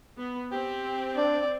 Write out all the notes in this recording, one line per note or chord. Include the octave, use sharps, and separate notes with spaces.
B3
C4 G4
D4 D5